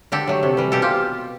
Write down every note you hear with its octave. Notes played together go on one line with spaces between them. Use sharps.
D3 G4 A4
F#3 A3
C3
E3 G3
B2 G4 A4
F4 G4